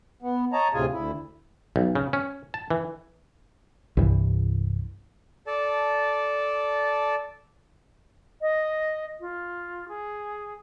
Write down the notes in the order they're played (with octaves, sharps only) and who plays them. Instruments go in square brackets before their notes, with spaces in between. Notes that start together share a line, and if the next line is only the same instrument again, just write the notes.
[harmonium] B3
C#5 D#5 A5 A#5
D2 A2 C3 F4 G#4 G#5
D2 E4
[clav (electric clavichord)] B1
C#3
C#4
A5
E3
[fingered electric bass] C2 G2 E3
[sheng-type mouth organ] A4 D5 A5
[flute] D#5
F4
G#4